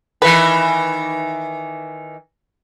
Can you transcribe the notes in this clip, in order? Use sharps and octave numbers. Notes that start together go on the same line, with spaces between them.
D#3 E3 B4